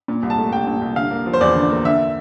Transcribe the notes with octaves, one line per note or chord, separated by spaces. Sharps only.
A#2
C2
A5
A3
C2 G5
A#2
C2
D3 F5
A#3
F3
C5
E2 D5
D3
A#3
D3 E5